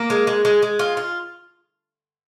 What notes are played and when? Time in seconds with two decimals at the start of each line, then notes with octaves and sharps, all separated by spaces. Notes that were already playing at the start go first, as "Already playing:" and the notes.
Already playing: A#3
0.10 G#3
0.27 G#3
0.45 G#3
0.62 G#3
0.79 F4
0.97 F4